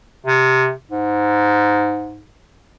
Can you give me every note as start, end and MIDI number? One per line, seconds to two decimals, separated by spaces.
0.26 0.72 48
0.91 2.31 44